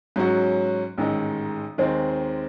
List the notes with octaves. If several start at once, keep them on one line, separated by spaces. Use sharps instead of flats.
G#2 F#3 C#4 F#4
A1 G#2 D#3 G#3 D#4
D#2 D#3 G#3 C4